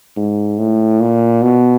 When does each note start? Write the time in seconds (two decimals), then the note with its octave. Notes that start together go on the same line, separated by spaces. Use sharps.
0.17 G#2
0.58 A2
1.00 A#2
1.42 B2